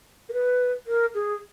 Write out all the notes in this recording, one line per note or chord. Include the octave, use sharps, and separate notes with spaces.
A#4
B4
A#4
G#4